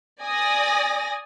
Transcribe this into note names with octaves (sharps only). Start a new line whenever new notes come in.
D5 G#5 D#6 A#6